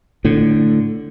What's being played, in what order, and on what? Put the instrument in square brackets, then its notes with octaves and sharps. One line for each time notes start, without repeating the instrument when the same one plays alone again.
[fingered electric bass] A2 D3